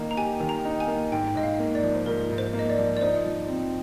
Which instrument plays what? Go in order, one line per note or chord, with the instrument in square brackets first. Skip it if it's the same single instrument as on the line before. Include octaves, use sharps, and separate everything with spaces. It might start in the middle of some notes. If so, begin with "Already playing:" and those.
Already playing: [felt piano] D#3 A#3 D#4
[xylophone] A#5
[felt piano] G4 [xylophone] G#5
[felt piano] D#3
[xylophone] A#5
[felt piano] D#4
[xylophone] G#5
[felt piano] A#3
[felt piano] G#2 [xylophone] G5
[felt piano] G#2 [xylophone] D#5
[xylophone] F5
[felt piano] A#3
[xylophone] D5
[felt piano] F3
[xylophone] C5
[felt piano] G#2 [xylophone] A#4
[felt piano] G#2
[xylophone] C5
[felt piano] A#3
[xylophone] D#5
D5
[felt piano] F3
[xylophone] D5
[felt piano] D#4 [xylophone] C5
[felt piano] F3
C4